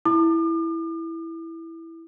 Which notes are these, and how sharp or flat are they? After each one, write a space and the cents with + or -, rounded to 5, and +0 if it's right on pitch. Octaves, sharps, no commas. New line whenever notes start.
E4 +0 D6 +45